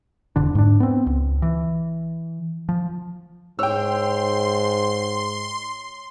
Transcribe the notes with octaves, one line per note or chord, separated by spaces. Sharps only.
E1 F2 D3 D4
G#2 D4
B3 C4
C#2
E3
F3
G#2 C#5 G5 C6 E6